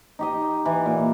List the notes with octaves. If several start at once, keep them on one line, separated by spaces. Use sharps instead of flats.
D#4 G4 D#5
E3
A#2